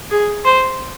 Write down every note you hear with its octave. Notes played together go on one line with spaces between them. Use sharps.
G#4
C5